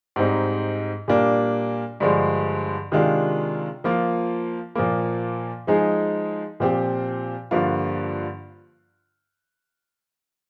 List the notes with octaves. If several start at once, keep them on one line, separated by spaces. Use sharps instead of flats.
G#2 G3 C4 D#4
A#2 G3 A#3 D4
G2 D3 F3 G#3
C3 D#3 G#3 D4 F4
F3 A#3 F4
A#2 F3 A#3
F3 G#3 D#4 G#4
A#2 F3 C4 G4
G2 D3 F3 A#3 F4